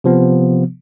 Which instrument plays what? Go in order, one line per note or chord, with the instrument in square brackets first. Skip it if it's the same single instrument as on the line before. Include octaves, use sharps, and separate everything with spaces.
[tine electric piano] C3 F3 B3